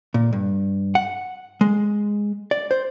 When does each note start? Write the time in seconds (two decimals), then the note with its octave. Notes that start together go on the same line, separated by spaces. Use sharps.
0.14 A#2
0.33 G2
0.95 F#5
1.61 G#3
2.51 D5
2.71 C5